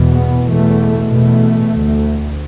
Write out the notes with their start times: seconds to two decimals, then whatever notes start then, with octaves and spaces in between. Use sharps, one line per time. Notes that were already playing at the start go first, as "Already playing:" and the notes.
Already playing: E2 B2
0.13 B3
0.46 E2 B2 A3
1.10 E2 B2 A3
1.75 D2